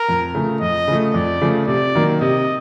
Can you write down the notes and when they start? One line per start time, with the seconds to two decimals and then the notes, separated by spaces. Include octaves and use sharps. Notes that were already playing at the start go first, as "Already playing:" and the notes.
Already playing: A#4
0.09 F2
0.34 C#3 F3 A3
0.61 F2 D#5
0.88 C#3 F3 A3
1.14 F2 D5
1.41 C#3 F3 A3
1.67 C3 D5
1.95 D#3 F#3 A#3
2.21 C3 D#5